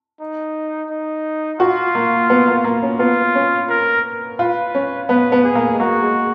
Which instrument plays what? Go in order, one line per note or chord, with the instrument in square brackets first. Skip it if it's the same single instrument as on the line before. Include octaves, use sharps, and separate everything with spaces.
[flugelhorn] D#4
D#4
[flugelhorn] F4 [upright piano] F#4
[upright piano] A#3
B3
A#3
A#3
C#4
[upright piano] B3 [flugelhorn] F4
[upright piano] C#4
[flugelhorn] A#4
[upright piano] F4 [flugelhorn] B4
[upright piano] C#4
[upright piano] B3 [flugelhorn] B4
[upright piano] B3
[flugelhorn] G#4
[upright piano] A#3
G#3
[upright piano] A#3 [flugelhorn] F#4
[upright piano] G#3